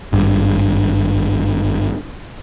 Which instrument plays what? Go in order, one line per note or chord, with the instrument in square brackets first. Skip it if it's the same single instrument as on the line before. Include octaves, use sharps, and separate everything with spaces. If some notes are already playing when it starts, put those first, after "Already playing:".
[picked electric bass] G#1 G2